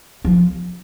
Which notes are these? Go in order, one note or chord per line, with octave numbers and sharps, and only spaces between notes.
F3